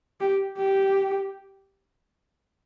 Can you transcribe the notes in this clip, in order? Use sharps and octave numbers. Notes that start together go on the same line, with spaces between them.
G4
G4